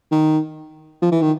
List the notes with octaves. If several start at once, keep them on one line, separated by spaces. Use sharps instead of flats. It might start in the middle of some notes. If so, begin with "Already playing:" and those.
D#3
F3
E3
D#3